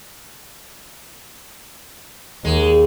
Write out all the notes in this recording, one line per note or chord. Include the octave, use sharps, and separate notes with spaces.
D#2 G#3